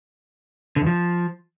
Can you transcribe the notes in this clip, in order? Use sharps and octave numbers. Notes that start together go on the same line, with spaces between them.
D3
E2
F3